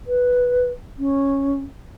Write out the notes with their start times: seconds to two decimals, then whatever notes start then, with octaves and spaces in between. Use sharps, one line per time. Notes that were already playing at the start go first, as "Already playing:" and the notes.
0.07 B4
0.99 C#4